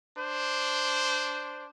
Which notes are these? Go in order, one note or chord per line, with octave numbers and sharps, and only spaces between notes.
D4 C5